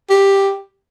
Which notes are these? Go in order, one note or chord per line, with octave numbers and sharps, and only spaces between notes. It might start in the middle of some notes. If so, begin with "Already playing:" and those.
G4